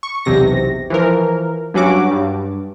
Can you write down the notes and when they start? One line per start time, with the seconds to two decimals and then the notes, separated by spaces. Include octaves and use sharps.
0.03 C#6
0.25 B1 E2 C3 A#6
0.90 E3 F3 A#4
1.74 G2 F#3 C#4 F#4 D6
2.11 G2